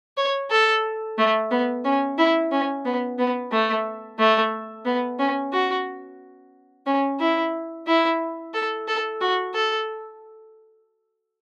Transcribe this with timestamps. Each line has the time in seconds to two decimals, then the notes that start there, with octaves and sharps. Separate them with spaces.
0.17 C#5
0.51 A4
1.18 A3
1.51 B3
1.84 C#4
2.18 E4
2.52 C#4
2.85 B3
3.19 B3
3.52 A3
4.19 A3
4.85 B3
5.19 C#4
5.53 F#4
6.86 C#4
7.20 E4
7.87 E4
8.54 A4
8.88 A4
9.21 F#4
9.54 A4